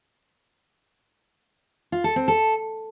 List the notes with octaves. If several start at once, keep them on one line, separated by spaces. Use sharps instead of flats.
F4
A4
C4
A4